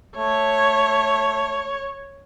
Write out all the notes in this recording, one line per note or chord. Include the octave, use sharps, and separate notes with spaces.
A3 C#5